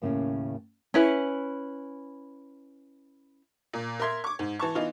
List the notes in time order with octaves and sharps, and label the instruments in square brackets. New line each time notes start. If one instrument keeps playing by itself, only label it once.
[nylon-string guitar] D#2 A2 C#3 A#3 C#4
[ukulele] C#4 E4 B4
[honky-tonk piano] A#2
A#4 E5 C6 G#6
C#6 D6
G#2
E3 A5 C#6
E3 B3 D#4 F4